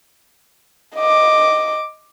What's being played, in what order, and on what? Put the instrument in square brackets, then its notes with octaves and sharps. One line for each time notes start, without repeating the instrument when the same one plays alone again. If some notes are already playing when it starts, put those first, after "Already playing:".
[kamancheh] D#5 D6